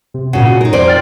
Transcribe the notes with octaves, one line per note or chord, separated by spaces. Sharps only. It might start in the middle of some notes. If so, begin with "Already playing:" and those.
C3
A#2 C#3 F#4 F#5
D#4 A#4
F2 C5 D5
G5 F6 A6